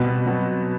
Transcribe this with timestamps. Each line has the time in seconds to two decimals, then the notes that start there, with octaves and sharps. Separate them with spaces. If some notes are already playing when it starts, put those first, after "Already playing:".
Already playing: B2 G3 C4 F#4 B4
0.26 F#3 C4 F#4 B4